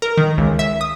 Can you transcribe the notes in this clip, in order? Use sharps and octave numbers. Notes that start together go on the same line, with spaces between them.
A#4
D#3
C#2
E5
D#6